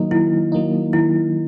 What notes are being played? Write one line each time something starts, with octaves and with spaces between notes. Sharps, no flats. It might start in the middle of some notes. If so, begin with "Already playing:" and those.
Already playing: D#3 F#3 A#3 D#4
D#3 E4
F#3 A#3 D#4
D#3 E4